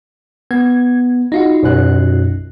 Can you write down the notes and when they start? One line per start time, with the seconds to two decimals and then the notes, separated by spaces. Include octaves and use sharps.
0.51 B3 G#6
1.32 D#4 F4 F#4
1.63 B1 F#2 F#6